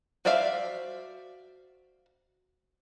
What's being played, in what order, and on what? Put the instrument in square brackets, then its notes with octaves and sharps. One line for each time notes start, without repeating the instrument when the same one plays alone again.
[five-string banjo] F#4 C5 D5 E5 F5